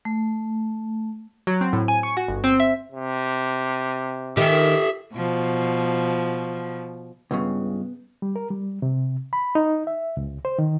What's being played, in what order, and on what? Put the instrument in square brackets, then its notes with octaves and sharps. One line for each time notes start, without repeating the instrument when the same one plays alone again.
[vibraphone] A3
[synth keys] F#3
C4
A2
G#5
C#6
F#4
G1
C4
E5
[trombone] C3
[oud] D#3 [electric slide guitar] G4 A4 [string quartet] E5
[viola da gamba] B2 F3
[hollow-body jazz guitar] C#2 G2 C#3 [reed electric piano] B3
[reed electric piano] G3
A#4
G3
C3
B5
D#4
E5
C#2
C5
D#3